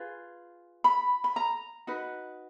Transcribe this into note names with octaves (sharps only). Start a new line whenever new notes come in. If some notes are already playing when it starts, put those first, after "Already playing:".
Already playing: F4 G#4 B4
B5
B5
A#5
D#4 F#4 B4